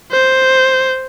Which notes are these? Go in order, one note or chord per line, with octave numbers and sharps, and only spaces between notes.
C5